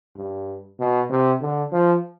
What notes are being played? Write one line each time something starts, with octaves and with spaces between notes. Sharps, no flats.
G2
B2
C3
D3
F3